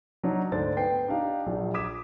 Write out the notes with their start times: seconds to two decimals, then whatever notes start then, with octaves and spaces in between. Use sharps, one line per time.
0.24 F#3 D4 D#4 C#5
0.52 D2 G#2 D4 C5 D5 A6
0.77 B3 G5 C7
1.08 D4 D#4 G4 F5
1.46 A#1 A#2 F#3
1.74 D6 D#6 G#6 B6 E7